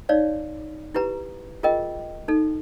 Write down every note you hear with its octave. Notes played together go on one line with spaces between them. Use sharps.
D#4 C#5 D5 F5
E4 G4 B4 A#5
F4 G#4 A#4 D#5 G5
D#4 A4